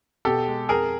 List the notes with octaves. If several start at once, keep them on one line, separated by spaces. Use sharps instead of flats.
B2 G4 A4
G#3
F2 G#4 A#4